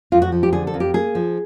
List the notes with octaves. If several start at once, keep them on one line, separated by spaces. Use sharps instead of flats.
F2 F4
F#4
F3
G4
D3 G#4
A4
F2
G4
A#3 G#4
F3